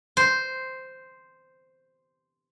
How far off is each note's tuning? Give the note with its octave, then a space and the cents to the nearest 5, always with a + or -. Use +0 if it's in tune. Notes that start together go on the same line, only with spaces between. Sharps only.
C5 -5